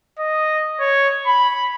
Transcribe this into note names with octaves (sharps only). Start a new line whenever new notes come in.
D#5
C#5
B5